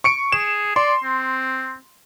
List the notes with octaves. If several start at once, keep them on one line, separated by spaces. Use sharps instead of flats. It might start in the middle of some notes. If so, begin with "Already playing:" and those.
C#6 C#7 D7
G#4 E7
D5 C6
C4